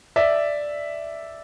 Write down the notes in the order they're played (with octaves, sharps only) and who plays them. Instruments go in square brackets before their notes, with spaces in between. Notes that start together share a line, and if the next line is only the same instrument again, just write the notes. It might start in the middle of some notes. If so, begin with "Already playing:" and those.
[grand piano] D5 E5